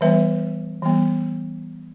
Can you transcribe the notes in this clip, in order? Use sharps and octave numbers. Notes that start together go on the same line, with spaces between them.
E3 G3 B3 B4 E5
E3 G3 B3